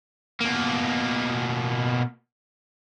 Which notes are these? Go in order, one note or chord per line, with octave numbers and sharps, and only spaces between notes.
B2 A#3